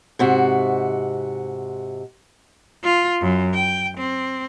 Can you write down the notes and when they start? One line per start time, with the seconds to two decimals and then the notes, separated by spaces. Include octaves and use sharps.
0.19 G#2 C3 F#4
2.83 F4
3.21 F#2
3.54 G5
3.98 C4